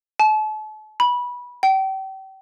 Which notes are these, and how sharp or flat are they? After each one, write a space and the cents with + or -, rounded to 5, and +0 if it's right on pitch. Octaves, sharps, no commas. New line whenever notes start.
A5 -40
B5 -20
G5 -35